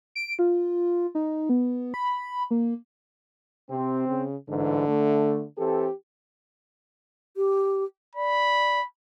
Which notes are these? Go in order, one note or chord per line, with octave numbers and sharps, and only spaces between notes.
D7
F4
D#4
B3
B5
A#3
C3 C4
C#3
A1 G#2 D3 E3
A3
E3 C4 G4 A4
G4
D5 B5